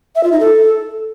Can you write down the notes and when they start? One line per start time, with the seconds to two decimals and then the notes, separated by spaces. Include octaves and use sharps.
0.15 E5
0.23 F4
0.32 D#4
0.40 A4